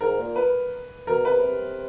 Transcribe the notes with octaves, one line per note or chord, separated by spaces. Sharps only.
G#2 A#4
A#2
B4
B2 A#4
C3 B4
C3